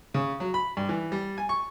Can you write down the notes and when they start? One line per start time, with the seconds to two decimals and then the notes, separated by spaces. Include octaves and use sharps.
0.14 C#3
0.40 F#3
0.54 B5
0.77 G2
0.89 E3
1.12 G3
1.38 G#5
1.49 C#6